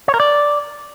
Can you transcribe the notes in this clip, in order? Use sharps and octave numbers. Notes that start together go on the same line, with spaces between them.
C#5
A#4
D5